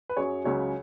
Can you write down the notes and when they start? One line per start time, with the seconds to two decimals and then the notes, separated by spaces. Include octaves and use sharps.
0.10 B4
0.17 F#2 F#3 G#4 C#5
0.44 C#2 C#3 F#3 G#4 C#5